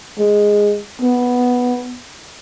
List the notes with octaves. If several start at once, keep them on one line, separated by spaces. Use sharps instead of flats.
G#3
B3